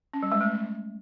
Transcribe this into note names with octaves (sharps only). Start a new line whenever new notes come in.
C#4
G3
G#3
A3